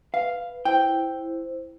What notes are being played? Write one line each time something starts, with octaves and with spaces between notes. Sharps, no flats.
B4 F5
E4 C5 G5